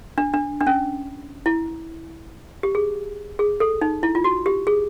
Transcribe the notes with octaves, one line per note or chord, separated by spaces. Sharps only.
D4
D4
D4
C#4
E4
G4
G#4
G#4
A4
D#4
E4
F4
F#4
G4
G#4